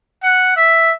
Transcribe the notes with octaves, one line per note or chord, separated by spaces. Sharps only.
F#5
E5